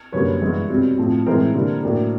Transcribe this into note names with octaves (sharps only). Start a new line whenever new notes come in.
F#2 D3 G3 A#3 B4 C#5
G2 E3 G#3 B3
B2 G3 C4
A2 F3 A3 C4
A2 E3 G#3 C4 A#4 C5
D3 G3 A#3
A2 F#3 A#3 D4